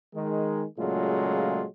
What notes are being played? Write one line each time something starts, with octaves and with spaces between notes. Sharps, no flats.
D#3 G#3
A#2 C#3 F#3 G#3 A3 F4